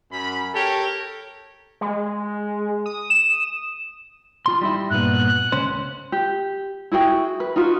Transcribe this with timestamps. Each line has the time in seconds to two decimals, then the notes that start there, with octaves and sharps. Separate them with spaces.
0.11 F#2 B5
0.54 G4 A4 A#4 C#5
1.81 G#3
2.86 D#6
3.10 E7
4.46 F4 C6
4.61 G3 D#4 E4
4.90 G2 A#2 B3 F#6
5.52 C#2 C#4 C5
6.12 G4
6.92 E4 F#4 G#4 G5
7.40 B4
7.56 D#4 F4 F#4